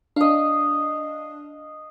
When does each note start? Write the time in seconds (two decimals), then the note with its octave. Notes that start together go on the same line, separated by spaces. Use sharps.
0.16 D4 D#5 F5